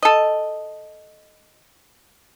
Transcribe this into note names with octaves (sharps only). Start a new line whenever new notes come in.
A4 D#5